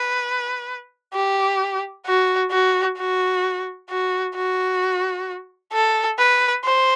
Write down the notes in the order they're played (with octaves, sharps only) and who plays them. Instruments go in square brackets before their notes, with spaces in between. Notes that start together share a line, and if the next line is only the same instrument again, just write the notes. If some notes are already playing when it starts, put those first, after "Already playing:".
Already playing: [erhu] B4
G4
F#4
F#4
F#4
F#4
F#4
A4
B4
C5